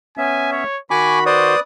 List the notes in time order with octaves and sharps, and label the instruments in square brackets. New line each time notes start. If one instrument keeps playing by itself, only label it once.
[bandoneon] B3 C#4 E5 [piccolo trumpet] G#5
[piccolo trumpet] C#5
[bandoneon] D#3 F#4 [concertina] G#5 C#6 D6 [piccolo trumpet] B5
[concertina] B4 D5 D#6 [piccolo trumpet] C5